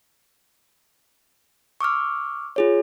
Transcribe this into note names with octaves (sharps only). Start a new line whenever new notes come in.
C#6 D6 E6 F6
F4 G#4 C#5